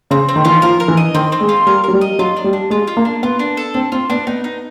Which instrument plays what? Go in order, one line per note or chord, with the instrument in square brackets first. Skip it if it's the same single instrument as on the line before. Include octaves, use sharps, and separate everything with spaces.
[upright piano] C#3 [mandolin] C4
[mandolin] C4
[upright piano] D#3
[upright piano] E3 [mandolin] F4
[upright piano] F3 [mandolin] A#4
[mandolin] A#4
[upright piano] E3
[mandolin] D#5
[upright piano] D#3 [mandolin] C4
[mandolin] C4
[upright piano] G#3
[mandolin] F4
[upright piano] G3 [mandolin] A#4
[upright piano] F#3 [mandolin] A#4
[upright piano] G3
[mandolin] D#5
[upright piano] F#3 [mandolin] F4
[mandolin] D4
[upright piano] G3
[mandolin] D4
[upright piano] G#3 [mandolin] F4
[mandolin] F4
[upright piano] A#3
[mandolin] D4
[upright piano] B3 [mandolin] F4
[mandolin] D4
A4
[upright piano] C4 [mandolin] D4
[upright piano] C4 [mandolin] F4
[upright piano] B3 [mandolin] D4
[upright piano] B3 [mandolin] D#4
[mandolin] D#4